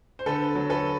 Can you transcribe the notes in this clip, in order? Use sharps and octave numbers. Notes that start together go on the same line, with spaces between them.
C5
D3 A4 B4
F#3
A4 B4